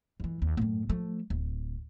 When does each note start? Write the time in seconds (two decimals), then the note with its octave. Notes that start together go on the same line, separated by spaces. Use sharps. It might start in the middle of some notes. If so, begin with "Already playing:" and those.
0.20 F2 E3
0.42 D#2
0.57 F#2 A2
0.89 F3 A3
1.30 D1